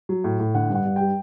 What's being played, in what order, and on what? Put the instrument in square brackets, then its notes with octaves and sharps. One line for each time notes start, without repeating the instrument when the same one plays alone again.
[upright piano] F#3
A2
A2
D3 F#5
G2
F#5
G2
G3 G5